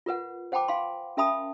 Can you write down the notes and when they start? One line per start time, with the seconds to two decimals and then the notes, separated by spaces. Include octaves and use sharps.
0.06 F4 A#4 B4 F#5
0.52 C5 F#5 G5 A5 B5 D6
0.68 F5 G#5 B5 C6
1.17 C#4 A#4 E5 A5 B5 D#6